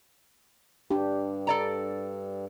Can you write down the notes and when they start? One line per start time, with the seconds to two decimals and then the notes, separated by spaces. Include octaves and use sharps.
0.90 G2 D4 G4
1.47 A4 D5 A#5